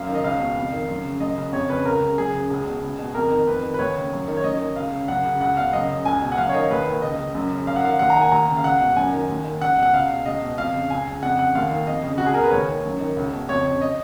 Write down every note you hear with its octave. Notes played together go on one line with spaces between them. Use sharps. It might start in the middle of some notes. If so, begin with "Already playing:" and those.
Already playing: F#2 F5
D#3
D#5
C#2 F5
B2
F2
D#3
F#2
C#3
F#2 D#5
C#3
F2 C#5
C#3 B4
C#2 A#4
C#3
F#2 G#4
C#3
C#2 G#4
B2
C#2
B2
F2 A#4
D#3
F2 B4
D#3
B4
D#2 C#5
C#3
F#2
D#3
C#5
F#2 D#5
D#3
C#2 F5
C#3
F#2 F#5
C#3
C#2 F#5
B2 F5
F#2 D#5
C#3
C#2 G#5
B2
F#5
F#2 F5
C#5
D#3 D#5
D#2 B4
D#3
C#2 D#5
C#3
F#2
C#3
F#2 F5
F#5
D#3 F5
D#2 F#5
A#5
D#3
G#5
D#2 A#5
C#3
F5
C#2 F#5
B2
F#2 G#5
D#3
D#2
D#3
C#2 F#5
B2 F#5
C#2 F5
B2
C#2 D#5
B2
F2 F5
C#3
C#2 G#5
C#3
F2 F#5
C#3 F#5
D#2 F5
D#3
F2 D#5
C#3
C#2 F#4
G#4
B2 A#4
B4
D#2 C#5
D#3
F#2
D#3
C#2
B2
F2 C#5
C#3
D#5